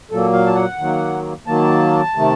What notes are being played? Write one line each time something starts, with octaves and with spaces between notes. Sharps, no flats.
A#2 F#3 A#3 A4
F5
A5
F#5
D#3 F#3 A#3
D#3 F#3 A#3 A5
C3 D#3 A3